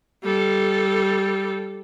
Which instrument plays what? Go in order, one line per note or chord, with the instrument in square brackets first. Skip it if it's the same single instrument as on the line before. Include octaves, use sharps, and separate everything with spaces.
[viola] G3 A4